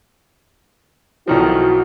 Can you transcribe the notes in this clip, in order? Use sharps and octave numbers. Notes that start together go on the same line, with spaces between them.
B1 D#3 F3 E4 F#4